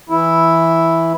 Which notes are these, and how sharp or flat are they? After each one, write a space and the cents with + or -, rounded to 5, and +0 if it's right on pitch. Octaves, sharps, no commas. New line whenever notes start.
E3 +0 E4 +0